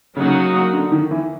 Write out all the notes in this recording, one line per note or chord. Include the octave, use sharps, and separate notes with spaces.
C#3 F#3 A#3 D#4 F#4
D3
D#3
E3